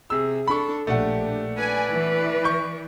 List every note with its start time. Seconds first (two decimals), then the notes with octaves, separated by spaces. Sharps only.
0.10 C3 G#4 E6
0.48 D4 A4 B5 C#6
0.87 A#1 A3 D4 G4 F#5
1.57 B4 D5 G#5
1.93 E3
2.44 C#6 G6